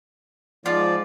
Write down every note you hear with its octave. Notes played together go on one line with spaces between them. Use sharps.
G#2 F3 F4 D5